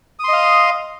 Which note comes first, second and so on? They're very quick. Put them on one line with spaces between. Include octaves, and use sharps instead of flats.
D#6 C6 D#5 F5